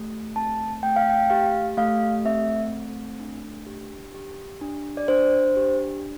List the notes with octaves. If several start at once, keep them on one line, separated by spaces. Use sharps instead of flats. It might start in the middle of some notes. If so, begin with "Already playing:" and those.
Already playing: A3 G4
C4 A5
A3 G5
F5
G5
G4 F5
A3 F5
C4 E5
A3
D4
G4
G4
D4
D5
D4 C5
G4